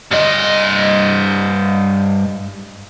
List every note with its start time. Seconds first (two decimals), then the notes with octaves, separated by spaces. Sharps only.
0.11 G2 D#5